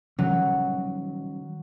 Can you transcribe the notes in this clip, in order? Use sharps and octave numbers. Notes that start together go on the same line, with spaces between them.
D#3 F#3 G3 C#4